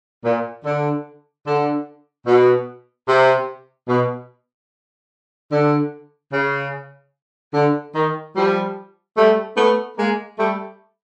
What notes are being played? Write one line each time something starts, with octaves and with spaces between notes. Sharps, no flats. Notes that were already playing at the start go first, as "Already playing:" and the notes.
A#2
D3
D3
B2
C3
B2
D3
C#3
D3
D#3
F3 G3
G3 A3
A3 B3
G#3 A#3
G3 A3